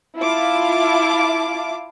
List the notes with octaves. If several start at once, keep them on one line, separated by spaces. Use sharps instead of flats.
E4 F4 E5 F5 A5 D6